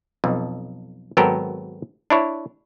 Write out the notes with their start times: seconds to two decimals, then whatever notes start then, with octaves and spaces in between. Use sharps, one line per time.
0.24 B1 F2
1.17 G#1 F#3 B3 A4 A#4 G5
2.10 D4 E4 C#5